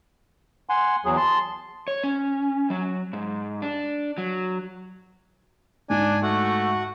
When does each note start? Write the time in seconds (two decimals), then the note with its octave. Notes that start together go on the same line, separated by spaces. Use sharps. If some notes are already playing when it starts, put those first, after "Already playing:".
0.70 F#5 G#5 C6
1.05 E2 F#3 G#4
1.17 A5 C6
1.88 C#5
2.04 C#4
2.70 F#3
3.13 G#2
3.62 D4
4.18 F#3
5.90 G#2 D4 D#4 G#5
6.23 A3 F#4 F#5